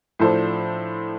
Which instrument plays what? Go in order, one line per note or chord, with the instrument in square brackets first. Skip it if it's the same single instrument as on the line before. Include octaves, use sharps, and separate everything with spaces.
[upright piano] A2 F3 D4 A4 C5